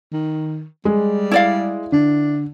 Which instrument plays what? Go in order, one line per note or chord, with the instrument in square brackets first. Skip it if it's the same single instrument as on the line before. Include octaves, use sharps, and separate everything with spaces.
[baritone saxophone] D#3
[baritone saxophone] G3 [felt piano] G#3
[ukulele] E4 D5 F5
[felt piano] D3 [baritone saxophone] D4